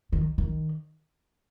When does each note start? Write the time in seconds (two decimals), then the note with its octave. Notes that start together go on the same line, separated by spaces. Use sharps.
0.13 D#3
0.38 D#3